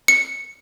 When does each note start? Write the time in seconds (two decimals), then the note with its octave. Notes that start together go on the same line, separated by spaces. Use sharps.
0.08 C#7